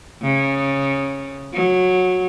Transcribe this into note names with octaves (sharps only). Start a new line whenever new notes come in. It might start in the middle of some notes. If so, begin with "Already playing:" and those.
C#3
F#3